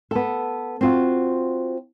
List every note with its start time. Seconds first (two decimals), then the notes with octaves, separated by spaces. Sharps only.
0.11 B3 A4
0.81 C4 F4 F#4